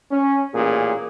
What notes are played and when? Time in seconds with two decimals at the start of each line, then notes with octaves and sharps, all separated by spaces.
0.10 C#4
0.53 A1 A#2 G#4